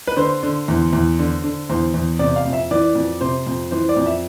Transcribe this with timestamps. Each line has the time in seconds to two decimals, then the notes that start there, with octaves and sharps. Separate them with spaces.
0.07 B4
0.16 D3 C5
0.43 D3
0.68 E2
0.93 E2
1.19 D3
1.44 D3
1.69 E2 C5
1.94 E2
2.19 C3 D5
2.36 F5
2.45 F2
2.53 E5
2.71 E3 D5
2.95 F2
3.21 C3 C5
3.47 F2
3.71 E3 C5
3.89 D5
3.97 F2
4.06 E5